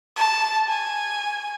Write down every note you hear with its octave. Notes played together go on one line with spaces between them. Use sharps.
A5
G#5